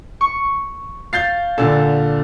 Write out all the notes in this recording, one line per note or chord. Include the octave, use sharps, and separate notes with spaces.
C#6
F5 G6 A6 C7
A#2 D3 A4